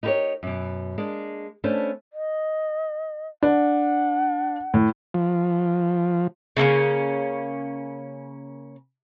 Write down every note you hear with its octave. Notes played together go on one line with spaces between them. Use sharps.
D#4 E4 G4 G#4 A#4 C#5
F#2 B2
G#3 A#3 D4
A3 B3 C#4 D4 C5
D#5
D4 F#5
A2
F3
C#3 A3 A#3 C#4